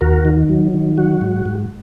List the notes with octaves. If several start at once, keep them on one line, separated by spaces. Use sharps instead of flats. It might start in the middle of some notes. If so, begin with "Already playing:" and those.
D#2 F#4 A#4
D#3
F#3
D#3
F#3 F#4
G#2
G#2